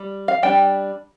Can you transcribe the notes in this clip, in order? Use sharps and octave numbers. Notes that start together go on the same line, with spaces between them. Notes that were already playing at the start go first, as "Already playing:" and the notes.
Already playing: G3
F5
G3 D4 G5